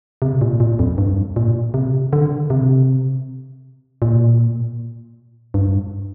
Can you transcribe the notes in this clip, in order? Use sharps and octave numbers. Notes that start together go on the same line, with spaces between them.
C3
A#2
A#2
F2
G2
A#2
C3
D3
C3
A#2
G2